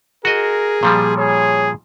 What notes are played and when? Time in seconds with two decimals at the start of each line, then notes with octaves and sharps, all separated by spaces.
0.25 F#4 G#4 A#4 D#5
0.83 A#2 F3 G3
1.18 G#4 C#5